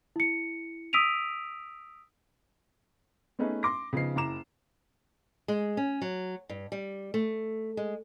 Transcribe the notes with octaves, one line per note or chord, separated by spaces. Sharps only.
E4 C#7
D#6 E6 B6 D7 D#7 F7
A3 B3 C#4 D#4 G#4 B4
C6 D6 A#6
C#3 F3 B3 D#4 C7
F#1 E4 A#5 D6 E7
G#3
C#4
F#3
G2
G3
A3
G#3